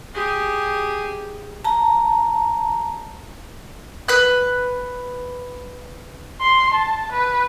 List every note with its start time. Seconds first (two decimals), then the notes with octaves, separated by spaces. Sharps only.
0.14 G4 G#4
1.64 A5 A#5
4.08 B4 F#6
6.41 C6
6.74 A5
7.12 B4